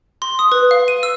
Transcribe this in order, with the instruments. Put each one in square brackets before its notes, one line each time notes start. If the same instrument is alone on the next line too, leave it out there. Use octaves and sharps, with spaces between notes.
[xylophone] C6
D#6
B4
F5
D#7
E6